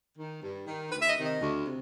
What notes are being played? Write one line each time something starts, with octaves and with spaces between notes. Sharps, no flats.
D#3
G2
D#3
D2 B4
E5
D#5
C3 D#3
D#5
D2
C3